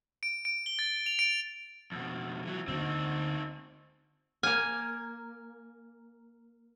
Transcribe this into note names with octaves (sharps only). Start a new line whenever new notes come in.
D7
D7
G7
A6
F7
D7
F2 B2
E3 F#3
D2 D3 A#3 C4 D#4
A#3 G#5 F6